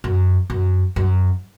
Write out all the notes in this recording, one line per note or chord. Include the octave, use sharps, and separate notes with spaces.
F#2
F#2
F#2